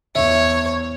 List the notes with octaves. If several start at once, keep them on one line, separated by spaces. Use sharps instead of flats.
E2 C#5 E5